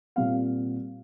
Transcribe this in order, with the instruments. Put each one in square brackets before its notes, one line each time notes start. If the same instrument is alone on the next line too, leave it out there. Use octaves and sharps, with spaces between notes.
[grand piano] A#2 G3 C4 F5